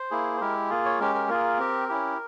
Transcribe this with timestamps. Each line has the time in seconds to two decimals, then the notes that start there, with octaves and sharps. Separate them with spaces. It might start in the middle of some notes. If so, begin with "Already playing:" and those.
Already playing: C5
0.11 A#3 E4 G#4
0.37 C5
0.41 G#3 E4 G4 A#4
0.70 A#3 F4 G#4
0.85 C#5
0.99 G#3 C#4 G4 A#4
1.15 A#4
1.29 A#3 F4 G#4 A#4
1.59 C4 G4
1.89 C#4 E4 G4